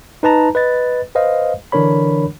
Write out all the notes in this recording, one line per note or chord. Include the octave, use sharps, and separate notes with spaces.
D#4 B4 A5 A#5
B4 D#5 A6
B4 C5 D#5 F5
D3 E3 D4 A#4 C#5 B5